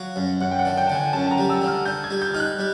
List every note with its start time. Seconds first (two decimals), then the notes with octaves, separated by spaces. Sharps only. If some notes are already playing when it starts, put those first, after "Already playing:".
Already playing: F#3 F5
0.16 F#2
0.41 F#2 F#5
0.51 G5
0.59 F#5
0.65 D3
0.77 G5
0.87 D3 A5
0.95 G#5
1.13 F#2 A5
1.27 A5
1.31 A#5
1.38 G3
1.49 E6
1.62 D3
1.67 F6
1.85 D3 G6
2.04 G#6
2.10 G3
2.22 G6
2.34 D#4 F6
2.40 F#6
2.59 G3